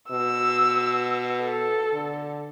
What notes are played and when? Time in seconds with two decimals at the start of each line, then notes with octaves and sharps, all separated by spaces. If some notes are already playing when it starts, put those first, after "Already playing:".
0.11 B2 E6
1.43 A4
1.93 D3